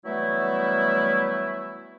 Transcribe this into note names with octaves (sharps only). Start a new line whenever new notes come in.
E3 F#3 G3 A3 B3 E4